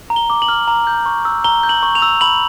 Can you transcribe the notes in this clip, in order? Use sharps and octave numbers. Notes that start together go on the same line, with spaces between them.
A#5
G7
D6
F#7
F6
A#5
G6
C#6
E6
A#5 G7
G6
F#7
C#6
F7
E6
B5 F#7